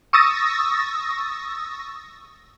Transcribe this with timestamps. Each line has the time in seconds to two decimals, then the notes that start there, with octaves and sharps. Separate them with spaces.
0.13 C#6 D#6 E6 A6 A#6